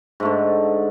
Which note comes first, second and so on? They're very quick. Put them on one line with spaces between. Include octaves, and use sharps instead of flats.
G#2 A3 D3